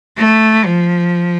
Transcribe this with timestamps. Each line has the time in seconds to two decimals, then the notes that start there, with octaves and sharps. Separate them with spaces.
0.18 A3
0.64 F3